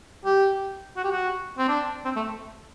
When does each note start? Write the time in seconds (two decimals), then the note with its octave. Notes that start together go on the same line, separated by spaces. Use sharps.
0.25 G4
0.97 F#4
1.04 G4
1.12 F#4
1.58 C4
1.68 D4
2.05 C4
2.16 A3